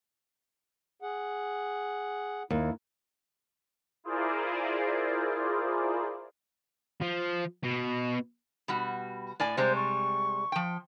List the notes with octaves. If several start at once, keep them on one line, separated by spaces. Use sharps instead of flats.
G#4 F#5
D#2 E4
E4 F4 G#4 A#4 C5 D5
F3
B2
B2 G3 F#4
A2 D5 G#5
C3 G3 G#3 C5
C#6
F3 G5